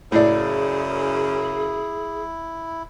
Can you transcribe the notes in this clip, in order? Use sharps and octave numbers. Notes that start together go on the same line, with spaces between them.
F#2 A2 C#3 E4 G#4 D5